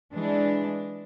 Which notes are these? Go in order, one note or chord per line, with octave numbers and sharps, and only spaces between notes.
E3 G#3 D4